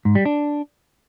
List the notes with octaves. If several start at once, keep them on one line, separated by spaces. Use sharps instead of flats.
G#2
G3
D4